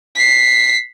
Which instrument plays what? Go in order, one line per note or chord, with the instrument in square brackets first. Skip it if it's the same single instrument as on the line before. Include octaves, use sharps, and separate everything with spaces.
[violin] B6 C7